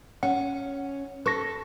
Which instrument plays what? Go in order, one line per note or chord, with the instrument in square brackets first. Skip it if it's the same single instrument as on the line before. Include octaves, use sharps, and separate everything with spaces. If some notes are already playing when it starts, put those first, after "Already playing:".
[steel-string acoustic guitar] C#4 [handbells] F#5
[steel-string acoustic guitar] A4 [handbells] B4 C#6 A#6